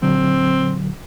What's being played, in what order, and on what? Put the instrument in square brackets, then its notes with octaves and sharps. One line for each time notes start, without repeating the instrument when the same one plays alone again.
[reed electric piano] A#2 D3 F#3 [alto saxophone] C4